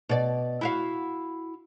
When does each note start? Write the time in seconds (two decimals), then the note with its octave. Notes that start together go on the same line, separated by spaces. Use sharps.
0.09 B2 D5
0.61 E4 F#4 F5